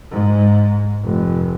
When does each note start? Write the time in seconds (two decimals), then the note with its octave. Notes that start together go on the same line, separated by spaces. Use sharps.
0.11 G#2
1.04 F1